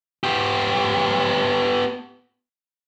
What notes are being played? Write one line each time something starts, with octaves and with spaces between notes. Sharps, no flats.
B3 G4